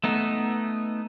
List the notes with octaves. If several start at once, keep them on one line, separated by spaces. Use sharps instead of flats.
A3 B3 D#4